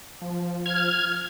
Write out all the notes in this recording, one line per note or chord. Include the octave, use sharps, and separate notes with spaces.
F3
F6 G#6